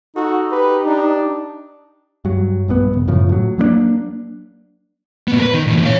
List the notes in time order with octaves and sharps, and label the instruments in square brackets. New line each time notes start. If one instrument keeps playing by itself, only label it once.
[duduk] D#4 [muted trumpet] F#4 [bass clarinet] A4
[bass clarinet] G4 [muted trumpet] B4
[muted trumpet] D4
[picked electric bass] G2 F#3
A#1 G2 D#3 B3
F#1
F#2 A2 C#3 F3
A2 F#3
F#3 A#3 B3 D4
[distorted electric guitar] A#2 B3
A#4 B4
D#3
A#2 E3
C#5 F5